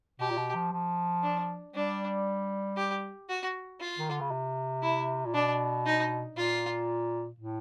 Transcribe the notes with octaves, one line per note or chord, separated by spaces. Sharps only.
B2 G4
A#2
B2
F3
F3
D4
G3 D4
G4
F#4
F4
D#3
D3
C#3
C3
E4
A#2
B2 D4
D#4
A#2 F4
A2